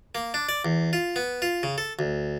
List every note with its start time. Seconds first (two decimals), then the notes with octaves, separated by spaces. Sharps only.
0.15 A#3
0.34 D4
0.49 D5
0.65 E2
0.93 F4
1.16 B3
1.42 F4
1.63 C#3
1.78 A4
1.99 D2